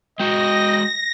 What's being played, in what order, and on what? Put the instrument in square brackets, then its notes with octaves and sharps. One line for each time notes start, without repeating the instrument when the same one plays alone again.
[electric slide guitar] G#3 F#4 [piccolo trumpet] D#5 [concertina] G5 [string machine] A#6